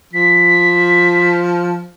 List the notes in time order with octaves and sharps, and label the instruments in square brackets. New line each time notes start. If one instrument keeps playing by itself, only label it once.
[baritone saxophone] F3 [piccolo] B6